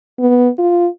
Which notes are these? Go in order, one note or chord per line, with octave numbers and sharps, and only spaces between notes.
B3
F4